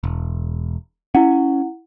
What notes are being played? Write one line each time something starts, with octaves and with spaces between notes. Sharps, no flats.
E1
C#4 E4 F#5